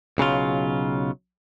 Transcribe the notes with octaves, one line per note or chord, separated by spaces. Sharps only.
B1 C#3 F#3 F4